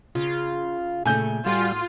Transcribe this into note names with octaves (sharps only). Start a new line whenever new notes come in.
C#3 F4
A#2 C#3 A3 G#5 G6
A2 G3 F4 F#4